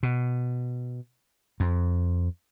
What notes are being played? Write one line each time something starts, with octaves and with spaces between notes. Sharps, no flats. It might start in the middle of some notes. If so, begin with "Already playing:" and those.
B2
F2